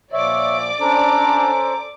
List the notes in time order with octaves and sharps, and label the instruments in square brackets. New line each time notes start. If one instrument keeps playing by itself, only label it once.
[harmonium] A#2 F3 [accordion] C#5 E5 [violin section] D5 D6
[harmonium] C#4 A4 C5 [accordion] D4 [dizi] A#5